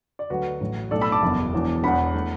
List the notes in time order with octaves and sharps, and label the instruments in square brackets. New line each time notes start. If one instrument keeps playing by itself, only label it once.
[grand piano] D5
D2 D3 F#3 F#4 B4
A1 A2 F#3
B1 A2 A3 A4 D5
B5 E6
A5 D6
F#1 E2 B2
E1 E2 E3
E1 E2 B2 B3 F#5 B5
E3 A3